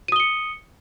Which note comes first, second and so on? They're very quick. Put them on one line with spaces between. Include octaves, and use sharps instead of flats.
D#7 D#6 G7 C#7